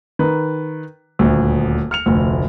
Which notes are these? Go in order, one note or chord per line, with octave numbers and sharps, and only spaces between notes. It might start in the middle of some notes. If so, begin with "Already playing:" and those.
D#3 B4
D#1 D2
F6 C#7 F7
F1 D2